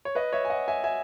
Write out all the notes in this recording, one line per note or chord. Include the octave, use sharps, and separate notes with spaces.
C#5
B4 D#5
C#5 E5
G#5
D#5 F#5
E5 G#5
E5 G#5